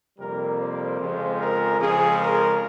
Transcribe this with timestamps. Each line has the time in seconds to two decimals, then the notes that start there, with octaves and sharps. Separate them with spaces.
0.17 F2 C3 G3 A#3 A#4
0.58 C5
0.98 F2 C#3 F3 G#3
1.38 A#4
1.78 F2 C#3 F3 G#3 G#4
2.18 A#4